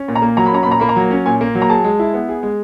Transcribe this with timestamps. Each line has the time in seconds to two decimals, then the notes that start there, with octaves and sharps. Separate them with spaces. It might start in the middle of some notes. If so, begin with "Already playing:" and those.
Already playing: C#4
0.08 A#2
0.15 A#5
0.22 A#3
0.37 F#3 A#5
0.46 B5
0.52 C#4 A#5
0.63 A#2 B5
0.71 A#5
0.80 A#3 B5
0.89 A#5
0.96 F#3
1.11 C#4
1.26 A#2 G#5
1.41 A#3
1.55 F#3
1.62 A#5
1.70 G#4 A5
1.84 G#3
1.99 E4
2.14 B3
2.29 G#4
2.43 G#3